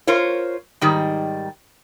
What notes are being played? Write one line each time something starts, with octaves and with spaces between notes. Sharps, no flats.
F4 A#4 C5 C#5
G#2 D#3 G3